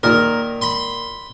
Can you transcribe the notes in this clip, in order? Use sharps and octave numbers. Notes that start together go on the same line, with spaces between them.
A#2 D#3 A#4
B5 C6